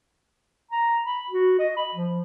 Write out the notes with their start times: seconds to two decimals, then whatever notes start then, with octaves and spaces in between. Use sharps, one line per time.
0.71 A#5
1.06 B5
1.31 F#4
1.59 D#5
1.77 B5
1.95 F3